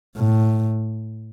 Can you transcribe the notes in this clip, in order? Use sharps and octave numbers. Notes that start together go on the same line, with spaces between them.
A2